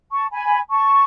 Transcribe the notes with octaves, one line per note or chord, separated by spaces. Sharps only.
A5 C#6
G#5 B5
A5 C#6